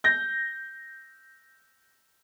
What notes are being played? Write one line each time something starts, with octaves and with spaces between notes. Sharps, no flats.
G6 A#6